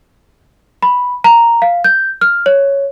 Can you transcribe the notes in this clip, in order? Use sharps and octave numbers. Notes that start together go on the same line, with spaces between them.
B5
A#5
F5
G6
F6
C#5